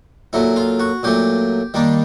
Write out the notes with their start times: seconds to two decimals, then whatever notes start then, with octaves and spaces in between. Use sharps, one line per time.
0.33 A#2 F#3 A3 E4
0.56 F4
0.80 F#4
1.03 A#2 F#3 A3 G4
1.74 D#3 G3 A#3 D4